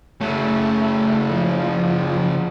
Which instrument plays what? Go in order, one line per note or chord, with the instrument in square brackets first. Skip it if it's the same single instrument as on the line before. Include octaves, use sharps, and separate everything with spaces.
[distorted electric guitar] C#3 F#3 [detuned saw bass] A3
[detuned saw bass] F3